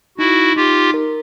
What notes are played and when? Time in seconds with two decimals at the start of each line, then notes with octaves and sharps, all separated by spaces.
0.18 D#4 E4 F#4
0.56 D#4 F4 G4
0.94 A#4